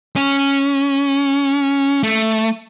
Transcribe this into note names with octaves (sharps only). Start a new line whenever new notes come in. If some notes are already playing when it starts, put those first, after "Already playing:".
C#4
A3